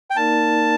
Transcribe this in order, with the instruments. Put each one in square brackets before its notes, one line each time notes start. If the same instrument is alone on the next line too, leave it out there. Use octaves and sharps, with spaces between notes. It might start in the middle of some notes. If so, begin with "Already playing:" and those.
[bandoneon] G5
[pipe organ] A#3 D#4 A#4 D5 [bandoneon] A5